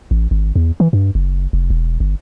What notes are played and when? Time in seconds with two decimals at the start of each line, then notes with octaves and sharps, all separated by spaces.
0.11 A1
0.31 G#1
0.56 E2
0.80 E3
0.93 G2
1.15 F#1
1.53 F1
1.70 E1
2.00 G1